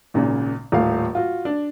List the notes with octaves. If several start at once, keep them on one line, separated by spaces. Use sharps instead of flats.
G#1 A#2 C#3
D#1 A2 F5
F4 F#4
D4